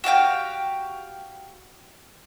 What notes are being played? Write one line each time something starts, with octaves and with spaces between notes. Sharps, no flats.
F#4 G4 F5 G5